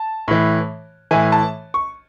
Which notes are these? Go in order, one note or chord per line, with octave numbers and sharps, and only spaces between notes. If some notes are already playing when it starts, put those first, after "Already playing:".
Already playing: A5
A2 E3
A2 E3 G#5
A5
C#6